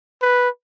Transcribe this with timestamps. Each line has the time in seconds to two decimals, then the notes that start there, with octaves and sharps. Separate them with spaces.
0.22 B4